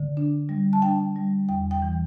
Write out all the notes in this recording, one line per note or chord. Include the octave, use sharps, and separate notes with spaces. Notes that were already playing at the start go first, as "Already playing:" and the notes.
Already playing: D3
D4
G3
A5
D4 G5
G3
E2 G5
G5
E3